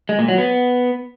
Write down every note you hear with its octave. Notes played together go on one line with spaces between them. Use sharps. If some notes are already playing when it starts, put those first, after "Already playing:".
G#3
A#2
F#3
B3